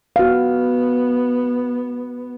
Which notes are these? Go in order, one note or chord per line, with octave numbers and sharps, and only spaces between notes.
B3 F#4 F5